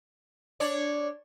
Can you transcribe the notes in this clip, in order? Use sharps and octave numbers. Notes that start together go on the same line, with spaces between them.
D4 C#5 D5